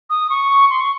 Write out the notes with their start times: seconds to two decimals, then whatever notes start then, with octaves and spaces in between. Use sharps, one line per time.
0.10 D#6
0.30 C#6
0.70 C6
0.80 C#6